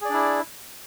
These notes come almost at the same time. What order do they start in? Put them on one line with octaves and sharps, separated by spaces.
G#4 D5 D4 E4